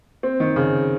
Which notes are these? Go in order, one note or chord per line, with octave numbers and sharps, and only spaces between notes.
C4
D#3
C#3